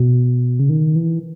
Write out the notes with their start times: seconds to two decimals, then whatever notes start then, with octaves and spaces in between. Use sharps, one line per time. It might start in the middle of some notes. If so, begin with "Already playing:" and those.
Already playing: B2
0.60 C#3
0.69 D#3
0.96 E3